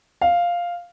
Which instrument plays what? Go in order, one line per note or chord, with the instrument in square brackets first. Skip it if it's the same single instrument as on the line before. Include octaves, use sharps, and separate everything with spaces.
[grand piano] F5